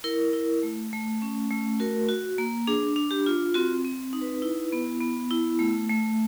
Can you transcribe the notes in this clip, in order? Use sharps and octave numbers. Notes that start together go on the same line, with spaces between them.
E4 A#4
E4
A3
A3
C#4
A3
F#4 A#4
F#4
A#3
D4 G#4
D4
G4
F4
C4 F#4
C4
D#4
B4
E4
B3
B3
E4
A3
A3